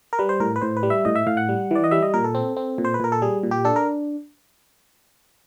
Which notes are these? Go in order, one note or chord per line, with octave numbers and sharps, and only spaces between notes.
A#4
G3 B4
C5
A2 A#4
B4
A2 C5
B4
G3
E5
A2 D#5
E5
A2 F5
F#5
G3
E3 D5
D#5
G3 E5
D#5
A#2 A#4
A4
C4
C4
A#2
C5
B4
A#2 A#4
A4
G3 G#4
A#2
G4
D4 A4
A#4